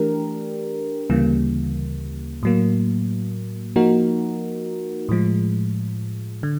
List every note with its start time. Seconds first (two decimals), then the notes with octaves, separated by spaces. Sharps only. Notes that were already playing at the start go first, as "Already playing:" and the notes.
Already playing: E3 A3 D4 G4 A#4
1.10 D2 C#3 E3 G3 A#3
2.43 A2 F#3 A#3
3.76 F3 A#3 D#4 F#4 A#4
5.09 A2 F3 G#3
6.43 D3